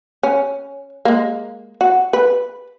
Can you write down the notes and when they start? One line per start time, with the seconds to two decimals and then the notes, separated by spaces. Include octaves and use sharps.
0.23 C#4
1.05 G#3 A#3
1.81 F#4
2.13 B4